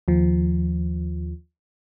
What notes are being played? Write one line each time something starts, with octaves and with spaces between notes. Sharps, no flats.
D#2 F3